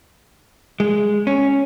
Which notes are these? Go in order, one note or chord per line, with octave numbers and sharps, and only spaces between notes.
G#3
C#4